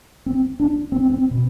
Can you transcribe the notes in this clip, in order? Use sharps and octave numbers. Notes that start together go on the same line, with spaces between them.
C4
D4
C4
C4
B2